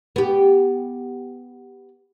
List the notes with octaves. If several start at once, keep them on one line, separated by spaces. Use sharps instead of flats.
B3 G4